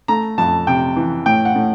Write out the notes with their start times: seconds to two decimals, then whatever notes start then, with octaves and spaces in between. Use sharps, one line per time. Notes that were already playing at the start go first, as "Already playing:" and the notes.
0.08 A3 A#5
0.38 F2 A5
0.67 C3 G5
0.96 E3
1.26 A2 G5
1.45 F#5
1.56 A2